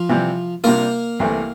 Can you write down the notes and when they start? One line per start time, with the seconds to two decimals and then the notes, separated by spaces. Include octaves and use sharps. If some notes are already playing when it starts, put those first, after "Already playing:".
Already playing: F3 F4
0.09 C3 E3 G3
0.64 C3 G3 A#3 D4 F4 A#4
1.20 C2 C3 E3 A3